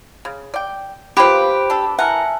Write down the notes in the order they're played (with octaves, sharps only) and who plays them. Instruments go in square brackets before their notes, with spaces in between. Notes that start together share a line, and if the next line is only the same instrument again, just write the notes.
[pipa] C#3
D5 G5
[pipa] A#3 B3 F4 [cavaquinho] G4 [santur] B4 [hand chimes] C5 D7
[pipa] D4 A4
[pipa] E3 A#4 [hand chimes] E5 G#5 A5 [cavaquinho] F#5